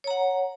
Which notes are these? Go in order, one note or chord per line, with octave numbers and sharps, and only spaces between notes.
C#5 F#5 A#5